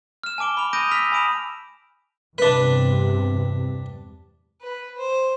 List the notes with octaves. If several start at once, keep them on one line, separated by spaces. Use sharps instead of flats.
F6 E7
G#5 A5 D6 D7 G7
B5 F7
D#6 G6 A#6 D7 D#7
E6 F6 A#6 B6 F7
G#5 B5 D#6 D7 E7 F7
E2 G2 C3 D4 B4
B4
C5